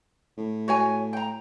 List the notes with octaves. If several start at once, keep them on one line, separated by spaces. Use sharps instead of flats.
A2
F#4 C#5 G#5
G5 A#5